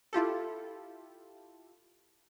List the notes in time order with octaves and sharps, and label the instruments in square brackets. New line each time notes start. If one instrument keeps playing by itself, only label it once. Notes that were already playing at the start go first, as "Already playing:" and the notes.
[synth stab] E4 F4 G4 A4